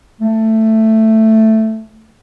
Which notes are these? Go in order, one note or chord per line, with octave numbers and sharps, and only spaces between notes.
A3